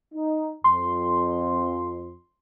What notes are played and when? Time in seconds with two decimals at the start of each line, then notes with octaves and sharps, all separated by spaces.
0.13 D#4
0.64 F2 C6